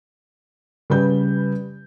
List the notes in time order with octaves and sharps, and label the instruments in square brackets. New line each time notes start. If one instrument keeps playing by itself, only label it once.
[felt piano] C#3 G3 B4 G6